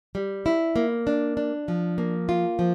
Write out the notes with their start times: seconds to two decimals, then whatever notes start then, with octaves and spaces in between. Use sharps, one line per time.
0.15 G3
0.46 E4
0.76 A#3
1.07 D4
1.37 D4
1.68 F3
1.98 A#3
2.29 F4
2.59 F3